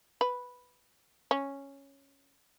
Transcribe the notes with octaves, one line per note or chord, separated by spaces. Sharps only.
B4
C#4